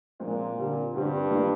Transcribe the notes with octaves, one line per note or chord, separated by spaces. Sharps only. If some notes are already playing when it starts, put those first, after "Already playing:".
A#2 F3 G#3 C4
D3 G3 C4
G2 D3 G3 C4
D#3 A#3 F4